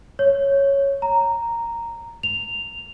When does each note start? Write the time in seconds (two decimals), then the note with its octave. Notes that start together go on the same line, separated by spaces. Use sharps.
0.19 C#5
1.02 A#5
2.23 F7